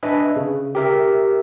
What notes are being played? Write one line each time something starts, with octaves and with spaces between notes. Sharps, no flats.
D4 B4 D#5 E5 G#5
C#3
G4 A#4 E5